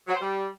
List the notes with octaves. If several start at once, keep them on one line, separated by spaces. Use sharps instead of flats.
F#3
C5
G3